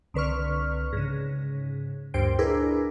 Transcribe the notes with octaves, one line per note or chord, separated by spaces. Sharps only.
C2 D3 B4 C#6 F6
G#2 C#3
D2 G2 A#2 C5 G5 D7
D4 E4 G#4 A#4 B4